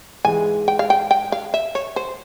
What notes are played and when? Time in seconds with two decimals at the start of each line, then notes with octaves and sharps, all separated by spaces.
0.25 G#2 E3 G#3 G#5
0.68 G5
0.79 F5
0.90 G5
1.11 G5
1.32 F5
1.54 E5
1.75 C#5
1.96 C5